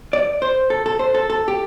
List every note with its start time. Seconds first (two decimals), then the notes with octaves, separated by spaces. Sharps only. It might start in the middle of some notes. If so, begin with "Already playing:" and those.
0.13 D5
0.42 C5
0.70 A4
0.86 A4
0.99 C5
1.14 A4
1.30 A4
1.48 G4